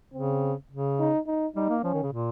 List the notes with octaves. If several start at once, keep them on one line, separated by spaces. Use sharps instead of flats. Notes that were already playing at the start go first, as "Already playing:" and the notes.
C#3 C4
C#3
D#4
D#4
G3 D#4
A#3
F3 C#4
D#3
C#3
A#2